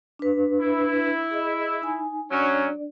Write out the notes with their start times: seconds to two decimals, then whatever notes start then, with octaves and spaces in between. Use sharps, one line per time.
0.19 D4 B4
0.60 E4
1.31 G#4 D#5
1.82 D#4 G#5
2.32 F#3 C#4 D4 D5